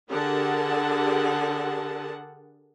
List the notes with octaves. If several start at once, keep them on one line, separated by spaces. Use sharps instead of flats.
D3 G4 G#4 A#4 F#5 A5